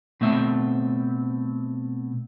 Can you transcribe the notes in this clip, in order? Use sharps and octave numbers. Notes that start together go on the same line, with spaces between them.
B2 A3 C4 E5